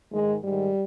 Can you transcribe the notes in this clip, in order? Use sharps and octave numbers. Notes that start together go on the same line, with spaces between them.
G#2 D#3 G#3
G#2 D#3 G3